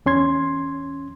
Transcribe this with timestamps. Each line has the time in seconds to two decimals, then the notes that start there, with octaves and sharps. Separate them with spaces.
0.06 E2 C#4 C6 G#6